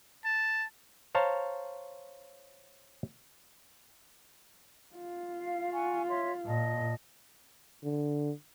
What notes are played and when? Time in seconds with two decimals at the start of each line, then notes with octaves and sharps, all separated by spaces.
0.25 A5
1.15 C5 C#5 F5 A5 A#5
4.95 F4
5.35 F5
5.72 F#5 G#5 C#6
6.07 C#5 E5 C6
6.45 A#2 D#5 A5
7.84 D3